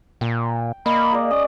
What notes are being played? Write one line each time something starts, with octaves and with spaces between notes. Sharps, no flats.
A#2 G5
A#3 D#5 B5
G#3 D5
C#4 D#6